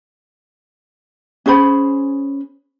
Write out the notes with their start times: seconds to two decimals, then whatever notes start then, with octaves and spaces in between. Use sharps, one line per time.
1.46 C#4 G#4 C5 B5